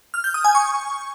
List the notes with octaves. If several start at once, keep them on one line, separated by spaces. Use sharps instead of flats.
F6
G6
D#6
G#5
C#6